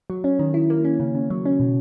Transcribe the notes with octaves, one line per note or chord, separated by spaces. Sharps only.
F#3
C#4
D#3
E4
A#3
C#4
C#3
C#3
F#3
C#4
B2